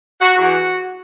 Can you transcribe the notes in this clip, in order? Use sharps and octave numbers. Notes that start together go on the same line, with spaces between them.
F#4
E2 E3 F#4